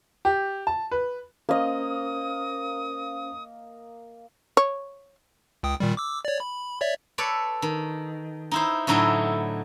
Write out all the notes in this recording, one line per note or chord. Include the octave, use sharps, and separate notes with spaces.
G4
A5
B4
A#3 C#4 A#4 C5 D#5 D#6
C#5
C#2 G5 D#6
A#2 D#3 G3
D6 E6
C#5 D5
B5
C#5 D5 E5
A4 B4 C#5 D5
D#3
D#4 E4 C5
A2 D3 F#3 D#4 E4